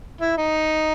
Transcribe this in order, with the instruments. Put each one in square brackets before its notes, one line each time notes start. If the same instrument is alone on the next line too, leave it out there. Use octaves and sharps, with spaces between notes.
[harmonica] E4
D#4